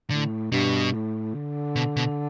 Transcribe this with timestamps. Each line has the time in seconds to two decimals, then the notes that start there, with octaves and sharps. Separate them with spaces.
0.10 A2 D3
0.52 G2 B2
0.94 A2
1.34 D3
1.76 B2
1.97 B2